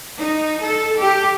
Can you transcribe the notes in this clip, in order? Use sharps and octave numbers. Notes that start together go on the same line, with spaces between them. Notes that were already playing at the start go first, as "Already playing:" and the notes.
D#4
A4
G4